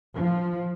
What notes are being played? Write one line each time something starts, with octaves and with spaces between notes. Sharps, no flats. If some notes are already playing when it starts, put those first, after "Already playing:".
F3